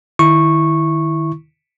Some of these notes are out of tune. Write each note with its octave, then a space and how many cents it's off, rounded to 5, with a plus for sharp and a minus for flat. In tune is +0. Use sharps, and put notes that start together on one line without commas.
D#3 -15 E4 +0 C#6 -10